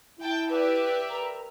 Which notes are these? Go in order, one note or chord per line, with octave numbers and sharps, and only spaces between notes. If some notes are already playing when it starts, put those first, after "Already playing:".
E4 G5 A5
G4 B4 D5 E5
A#4 B4 A#5